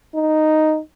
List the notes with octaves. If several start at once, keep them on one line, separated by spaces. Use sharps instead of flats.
D#4